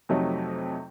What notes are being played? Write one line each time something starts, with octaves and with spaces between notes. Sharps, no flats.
F2 C3 F#3 A3 D#4